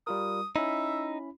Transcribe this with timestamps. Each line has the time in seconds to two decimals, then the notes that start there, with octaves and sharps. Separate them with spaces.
0.07 G3 F4 A#4 D#6
0.56 C#4 D#4 E4 E5 B5